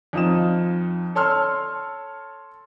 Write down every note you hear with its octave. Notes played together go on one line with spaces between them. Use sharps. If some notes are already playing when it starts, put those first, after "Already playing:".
F2 D#4 F4 D#6 E7
A4 C#5 A5 C6 E6 F6